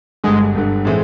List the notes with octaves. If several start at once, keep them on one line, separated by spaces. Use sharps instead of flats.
G1 G2 D3 G#3
G1 G2 D3
A2 E3 G#3 C4